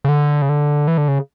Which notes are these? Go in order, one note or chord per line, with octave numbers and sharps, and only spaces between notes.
C#3
D3
C#3
D3
E3
D3
C#3